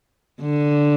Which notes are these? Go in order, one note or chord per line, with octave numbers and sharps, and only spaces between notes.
D3